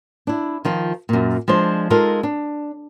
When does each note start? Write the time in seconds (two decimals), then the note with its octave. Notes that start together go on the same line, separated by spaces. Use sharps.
0.27 D4 E4
0.65 D#3 F3 F4
1.09 F#2 A#2
1.48 F3 G#3 D4 C5
1.90 G#3 D#4 F4 A4 A#4
2.23 D4